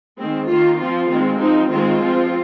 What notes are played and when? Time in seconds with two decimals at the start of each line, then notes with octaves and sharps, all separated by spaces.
0.18 D#3 G#3 C4
0.48 D#3 A#3 F4
0.79 F3 C4 F4
1.09 D#3 G#3 C4
1.40 F3 C4 D#4
1.70 D#3 G#3 C4 F4
2.01 F3 C4